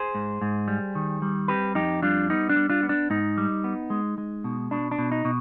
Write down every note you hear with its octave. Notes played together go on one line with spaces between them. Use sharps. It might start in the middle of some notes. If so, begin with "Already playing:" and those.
Already playing: G#4 C5
G#2
G#2
G3
D#3
G3
C4 G4 B4
F2 D#4 G4
G3 D4 F4
B3 D#4
D4
G3
D4 F4
B3
D4
G#2 D#4
G3
B3
G#3
G#3
B2
B2 D4
D4
B2
D#4
B2